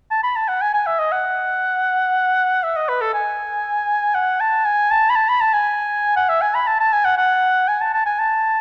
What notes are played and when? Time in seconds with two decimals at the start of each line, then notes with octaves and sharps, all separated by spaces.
0.11 A5
0.23 B5
0.36 A5
0.49 F#5
0.62 G#5
0.74 G#5
0.87 E5
0.99 D#5
1.12 F#5
2.63 E5
2.76 D#5
2.89 B4
3.01 A4
3.14 G#5
4.15 F#5
4.41 A5
4.65 G#5
4.91 A5
5.10 B5
5.16 A5
5.29 B5
5.41 A5
5.53 G#5
6.16 F#5
6.29 E5
6.42 G#5
6.54 B5
6.67 A5
6.80 A5
6.93 G#5
7.05 F#5
7.18 F#5
7.68 G#5
7.81 A5
7.94 A5
8.06 G#5
8.19 A5